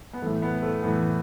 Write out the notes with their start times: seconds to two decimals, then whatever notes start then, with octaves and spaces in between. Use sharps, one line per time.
0.14 B3
0.22 A2 E3 A3
0.42 B3
0.63 A3
0.83 A2 E3 B3